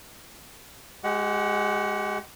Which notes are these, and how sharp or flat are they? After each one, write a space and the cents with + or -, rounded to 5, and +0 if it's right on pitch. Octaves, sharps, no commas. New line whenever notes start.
G#3 +0 G4 -40 F#5 +0